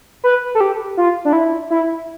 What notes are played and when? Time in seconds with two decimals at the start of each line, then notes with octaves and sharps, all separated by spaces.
0.24 B4
0.55 A4
0.61 G4
0.97 F4
1.25 D4
1.33 E4
1.70 E4